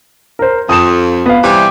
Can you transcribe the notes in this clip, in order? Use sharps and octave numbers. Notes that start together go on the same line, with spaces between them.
A#4 C5
F2 D#6 E7
B3 F5
C3 E3 G3 D6